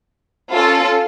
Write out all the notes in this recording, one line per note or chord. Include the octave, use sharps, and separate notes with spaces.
C#4 F4 A4